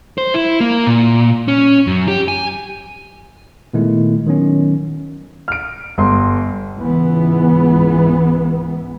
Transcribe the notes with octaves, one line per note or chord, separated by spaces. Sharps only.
C5
E4
A#3
A#2
C#4
F#2
G4
G#5
A#2 D#3 G#3 A3 B3 E4
D#3 F#3 B3 C#4
F6 D7
G1 C6
C#2 G#2 E3 B3